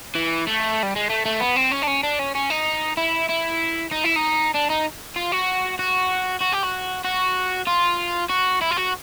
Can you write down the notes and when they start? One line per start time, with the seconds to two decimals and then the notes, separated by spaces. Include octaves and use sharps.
0.15 E3
0.47 A3
0.83 G3
0.96 G#3
1.10 A3
1.26 A3
1.41 B3
1.57 C4
1.72 C#4
1.83 D4
1.88 C#4
2.03 D4
2.19 C#4
2.35 C#4
2.50 D#4
2.97 E4
3.29 E4
3.91 D#4
4.04 E4
4.16 D#4
4.54 D4
4.70 D#4
5.16 F4
5.32 F#4
5.79 F#4
6.42 F#4
6.53 G4
6.64 F#4
7.04 F#4
7.67 F4
8.30 F#4
8.62 E4
8.71 F4
8.77 F#4